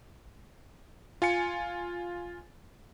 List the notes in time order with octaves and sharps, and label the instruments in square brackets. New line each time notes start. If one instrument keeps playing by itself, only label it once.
[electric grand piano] F4 G#5 C#7